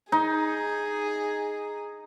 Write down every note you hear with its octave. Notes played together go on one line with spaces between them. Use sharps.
D#4 G#4